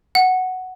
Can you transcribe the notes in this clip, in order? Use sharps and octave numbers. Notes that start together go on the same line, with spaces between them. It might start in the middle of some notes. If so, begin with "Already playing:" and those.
F#5